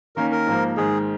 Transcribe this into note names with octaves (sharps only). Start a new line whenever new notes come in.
D#3 A#3 C#4 A#4
A#4
G#2 F3 A#3
G#2 D#3 G#3 G#4